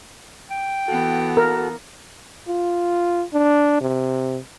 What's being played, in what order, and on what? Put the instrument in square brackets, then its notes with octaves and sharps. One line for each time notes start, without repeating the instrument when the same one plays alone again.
[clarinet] G5
[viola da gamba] E3 B3 [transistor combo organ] F#4 A4
[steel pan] A#4
[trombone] F4
D4
C3